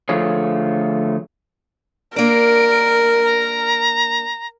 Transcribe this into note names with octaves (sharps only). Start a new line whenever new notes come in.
D3 F3 A3 F4 G#4 C#5
A#3 D4 A#4 D7
A#5